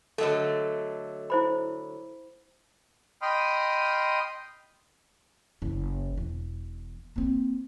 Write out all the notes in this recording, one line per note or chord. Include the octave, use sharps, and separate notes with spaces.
D3 F#3 A3 A4 D#5
E4 C5 B5
D#5 G5 B5 C6 D#6 F6
F#1
E1
A#3 C4